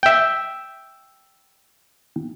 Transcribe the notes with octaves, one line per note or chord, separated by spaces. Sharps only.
E5 G5